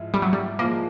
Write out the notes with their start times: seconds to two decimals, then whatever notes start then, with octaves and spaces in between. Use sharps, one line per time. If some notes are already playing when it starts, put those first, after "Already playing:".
Already playing: G#2 F3 G#3 E4
0.14 G3
0.22 F#3
0.33 G3
0.58 A#2 F3 G#3 A#3